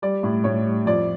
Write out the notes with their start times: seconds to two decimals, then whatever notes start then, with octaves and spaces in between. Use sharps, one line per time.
0.02 G3 D5
0.23 A2
0.44 A2 C#5
0.66 G3
0.86 F2 D5